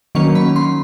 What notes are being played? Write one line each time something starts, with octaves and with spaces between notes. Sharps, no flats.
D#3 F#3 A#3 C#4 C#6
B5
C6